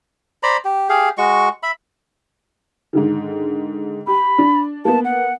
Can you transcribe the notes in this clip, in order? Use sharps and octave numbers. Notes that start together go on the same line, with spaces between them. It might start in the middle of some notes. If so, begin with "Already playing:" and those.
C5 D5 A#5 B5
G4
G4 G#4 F5
G#3 F#4 C#6
E5 B5
G#2 D3 D#3
G4 B5
D4
A#3 B3 A5
F#5